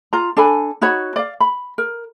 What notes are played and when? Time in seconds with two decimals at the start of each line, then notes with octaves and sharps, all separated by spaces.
0.13 F4 A#5
0.37 D4 A4 G#5 B5
0.81 D#4 F#4 C#5 B5
1.16 D5 F5
1.40 B5
1.78 A#4